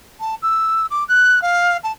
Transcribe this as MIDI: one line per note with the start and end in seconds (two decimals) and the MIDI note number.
0.20 0.35 81
0.42 0.86 88
0.90 1.04 86
1.08 1.39 90
1.42 1.77 77
1.83 1.91 81